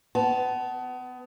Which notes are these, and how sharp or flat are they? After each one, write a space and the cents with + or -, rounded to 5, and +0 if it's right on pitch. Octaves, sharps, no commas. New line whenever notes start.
B3 +30 A5 -15